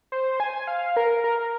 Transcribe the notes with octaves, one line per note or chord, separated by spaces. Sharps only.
C5
G#5
F5
A#4
A#4